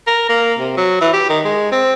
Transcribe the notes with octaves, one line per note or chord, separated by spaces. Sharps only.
A#4
A#3
C3
F#3
E3
G4
D#3
G#3
C4